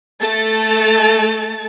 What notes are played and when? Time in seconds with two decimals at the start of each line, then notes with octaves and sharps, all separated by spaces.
0.20 A3 A4 A6